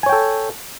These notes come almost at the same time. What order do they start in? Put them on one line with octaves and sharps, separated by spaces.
G#5 C#5 G5 A4